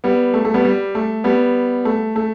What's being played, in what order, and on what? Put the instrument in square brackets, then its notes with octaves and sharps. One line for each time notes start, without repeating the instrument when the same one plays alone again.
[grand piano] G3 B3
A3
A3
G3 B3
G3
A3
G3 B3
A3
A3